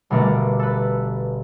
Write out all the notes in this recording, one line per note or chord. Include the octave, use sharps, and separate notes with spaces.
G1 B2 A3 D4 A#4
A4 B4